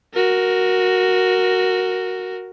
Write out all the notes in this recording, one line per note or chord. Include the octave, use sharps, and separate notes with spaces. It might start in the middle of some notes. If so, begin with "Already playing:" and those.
F#4 A#4